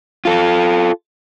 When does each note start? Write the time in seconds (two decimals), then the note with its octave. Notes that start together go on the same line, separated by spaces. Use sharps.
0.25 F4 A4